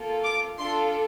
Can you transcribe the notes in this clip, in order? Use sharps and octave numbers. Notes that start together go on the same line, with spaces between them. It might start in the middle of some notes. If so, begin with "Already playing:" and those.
Already playing: A#3 F4 A4
D6
D4 F4 A4 C6